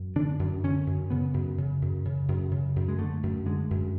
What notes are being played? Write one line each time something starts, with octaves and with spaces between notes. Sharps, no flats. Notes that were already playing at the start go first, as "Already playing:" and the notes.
Already playing: F#2
D3 D4
F#2
D3 C#4
F#2
C#3 B3
F#2
C#3
F#2
C#3
F#2
C#3
F#2
G#3
D3 A3
F#2
D3 G#3
F#2